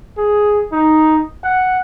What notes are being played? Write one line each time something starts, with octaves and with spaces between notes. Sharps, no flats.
G#4
D#4
F#5